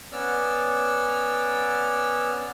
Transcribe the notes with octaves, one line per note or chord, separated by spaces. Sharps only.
B3 C#4 D5 E6 F6